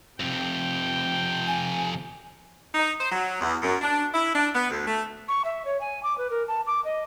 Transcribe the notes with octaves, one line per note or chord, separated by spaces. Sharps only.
F2 C3 G5
G#5
D#4
C5
F#3
E2
F#2
D4
E4
D4
B3
D2
A3
C#6
E5
C#5
G#5
D6
B4
A#4
A5
D6
D#5